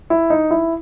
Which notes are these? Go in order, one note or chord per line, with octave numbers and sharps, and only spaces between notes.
E4
D#4
E4